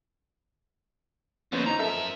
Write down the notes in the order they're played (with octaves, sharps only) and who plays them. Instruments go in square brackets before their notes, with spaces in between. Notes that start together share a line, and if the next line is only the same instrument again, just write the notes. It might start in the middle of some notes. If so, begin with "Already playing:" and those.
[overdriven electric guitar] F2 A#2 [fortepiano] B3 C#4 C5
[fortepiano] D#4 [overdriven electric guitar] A#5
[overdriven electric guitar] F#2 E5 [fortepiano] F3 A4 A#4